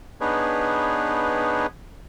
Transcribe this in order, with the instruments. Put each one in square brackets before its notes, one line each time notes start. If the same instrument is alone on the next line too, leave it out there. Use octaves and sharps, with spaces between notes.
[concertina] B3 D4 D#4 G#4 B4 C#5